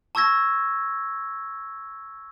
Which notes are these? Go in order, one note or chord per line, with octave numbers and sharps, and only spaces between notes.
A5 C#6 E6 G#6 A#6